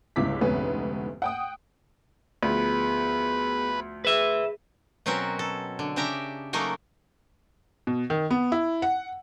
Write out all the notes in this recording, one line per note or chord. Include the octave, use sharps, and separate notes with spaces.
G1 C#2 E4 D6 B6
F1 D2 G#2 B3 C#4 B4
F#5 G5 D#6
D2 F3 B3 G#4 B4
G#4 B4 E5
B2 F#3 C4 C#4 F#4 A#4
A4
D3
C#3 D4 G4 E5 A#5
C#3 F#3 A3 A#3 D#4 A#4
B2
D#3
B3
E4
F#5